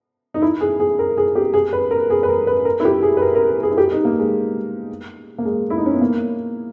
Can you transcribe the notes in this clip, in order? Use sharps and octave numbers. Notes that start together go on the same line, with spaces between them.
D#4
E4
G#4
G#4
A#4
G#4
G4
G#4
B4
A#4
G#4
B4
A#4
B4
A#4
E4
G4
G#4
B4
A#4
A#4
A#4
G#4
E4
G4
D#4
A#3
G#3
A#3
G#3
E4
D#4
C#4
B3
A#3